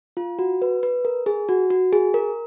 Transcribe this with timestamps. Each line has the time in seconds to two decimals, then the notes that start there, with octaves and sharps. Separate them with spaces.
0.17 F4
0.39 F#4
0.62 B4
0.83 B4
1.05 A#4
1.26 G#4
1.49 F#4
1.70 F#4
1.93 G#4
2.14 A#4